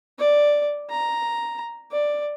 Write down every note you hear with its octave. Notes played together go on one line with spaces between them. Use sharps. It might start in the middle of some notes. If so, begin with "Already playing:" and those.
D5
A#5
D5